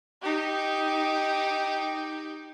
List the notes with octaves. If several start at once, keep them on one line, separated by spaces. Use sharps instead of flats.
D#4 G4